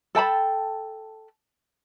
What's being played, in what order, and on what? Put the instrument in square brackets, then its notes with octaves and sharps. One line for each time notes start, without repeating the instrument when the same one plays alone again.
[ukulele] A4 G5 A5 B5